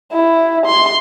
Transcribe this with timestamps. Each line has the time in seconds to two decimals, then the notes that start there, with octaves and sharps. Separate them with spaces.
0.13 E4
0.66 C6